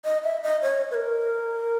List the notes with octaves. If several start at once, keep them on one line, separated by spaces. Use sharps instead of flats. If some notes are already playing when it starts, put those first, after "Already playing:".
D#5
E5
D#5
C#5
B4
A#4